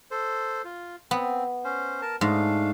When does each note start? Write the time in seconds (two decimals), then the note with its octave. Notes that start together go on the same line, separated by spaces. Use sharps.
0.11 A4 C5
0.64 F4
1.11 B3 C4
1.65 C#4 C5
2.02 A#4 A5
2.21 G#2 A3 D4 F5